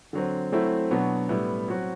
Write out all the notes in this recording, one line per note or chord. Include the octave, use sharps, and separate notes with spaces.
D3 F#3 C4
F#3 A3 C4 E4
B2 F#3 B3 D4
A2 G3 B3 E4
F#3 C4 F#4